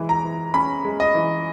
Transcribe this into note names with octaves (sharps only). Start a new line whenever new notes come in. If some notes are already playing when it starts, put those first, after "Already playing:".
Already playing: E3 G#3
A#5
E3
C#4 B5
G#3
D#5
E3